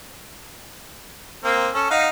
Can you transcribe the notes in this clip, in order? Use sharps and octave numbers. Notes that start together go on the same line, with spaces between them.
A#3 C4
C#4 A4
D#4 F5 F#5